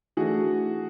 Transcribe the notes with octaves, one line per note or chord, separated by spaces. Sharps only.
E3 A3 D4 F#4 G#4